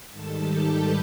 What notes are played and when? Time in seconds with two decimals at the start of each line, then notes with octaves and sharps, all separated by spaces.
0.10 G#2 D#3 G3 A4 A5
0.41 G4 G5
0.72 B4 B5